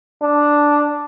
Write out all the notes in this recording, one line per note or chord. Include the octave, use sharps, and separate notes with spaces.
D4